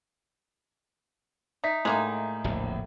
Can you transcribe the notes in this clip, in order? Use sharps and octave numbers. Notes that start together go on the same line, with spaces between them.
D#4 D5 E5 B6
A2 G#3 A#3 D#4
D1 A#1 E2